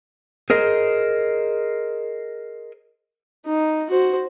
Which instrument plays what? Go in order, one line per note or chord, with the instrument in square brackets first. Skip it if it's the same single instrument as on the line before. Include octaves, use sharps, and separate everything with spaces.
[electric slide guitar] G#4 A#4 C5 D#5
[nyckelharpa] D#4
F#4 C5